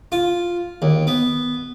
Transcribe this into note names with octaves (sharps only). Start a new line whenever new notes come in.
F4
D#2
B3